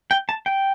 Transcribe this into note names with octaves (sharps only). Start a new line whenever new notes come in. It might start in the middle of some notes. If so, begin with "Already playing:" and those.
G5
A5
G5